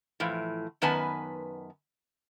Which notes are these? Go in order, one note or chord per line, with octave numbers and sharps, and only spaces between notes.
A2 E3 F3
F#2 D#3 B3 B4 G#5 A5